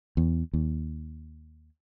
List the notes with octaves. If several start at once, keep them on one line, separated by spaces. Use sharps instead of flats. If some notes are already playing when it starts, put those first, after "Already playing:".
E2
D#2